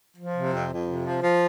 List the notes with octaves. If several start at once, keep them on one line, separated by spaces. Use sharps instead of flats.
F3
C3
F2
F2
C3
F3
F3